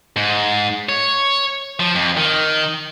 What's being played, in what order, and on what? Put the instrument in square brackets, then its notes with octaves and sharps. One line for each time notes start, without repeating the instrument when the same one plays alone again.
[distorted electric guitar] G#2
C#5
F3
F2
D#3